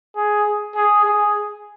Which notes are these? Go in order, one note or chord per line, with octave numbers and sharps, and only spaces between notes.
G#4
G#4
G#4